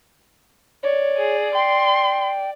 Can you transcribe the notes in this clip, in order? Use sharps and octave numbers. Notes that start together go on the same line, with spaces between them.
C#5 D5
G#4
G5 C6